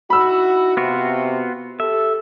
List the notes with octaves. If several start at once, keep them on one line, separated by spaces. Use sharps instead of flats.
D#4 E4 F#4 B5 E6
C3 B3 F4 F#4
G4 A4 E5